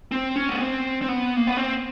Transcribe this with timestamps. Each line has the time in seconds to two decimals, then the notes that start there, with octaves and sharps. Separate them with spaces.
0.12 C4
0.36 C#4
0.49 B3
0.60 C4
1.02 C4
1.08 B3
1.36 A#3
1.47 B3
1.57 C4